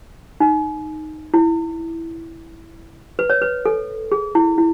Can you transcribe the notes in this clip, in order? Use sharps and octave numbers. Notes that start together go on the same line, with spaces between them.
D#4
E4
B4
C#5
B4
A4
G#4
E4
E4